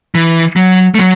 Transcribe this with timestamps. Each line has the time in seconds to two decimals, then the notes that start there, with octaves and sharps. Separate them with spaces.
0.15 E3
0.56 F#3
0.95 A3
0.99 F#3